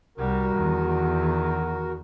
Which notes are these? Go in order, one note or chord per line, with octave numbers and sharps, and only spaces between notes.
C2 G3 F#4 A#4
E2 D#3